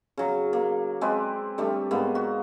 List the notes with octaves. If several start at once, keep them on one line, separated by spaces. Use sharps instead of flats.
C#3 F#3
A#3
G#3 C4 B4 D5
D3 G3 A3
G#2 A#3 B3
F#4